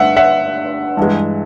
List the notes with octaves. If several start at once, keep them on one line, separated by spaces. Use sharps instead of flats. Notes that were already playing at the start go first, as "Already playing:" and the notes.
Already playing: G2 D3 G3 E5 F#5
E5 F#5
G2 E3 G#3